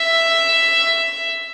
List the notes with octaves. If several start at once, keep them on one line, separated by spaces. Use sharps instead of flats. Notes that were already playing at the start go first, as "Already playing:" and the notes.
Already playing: E5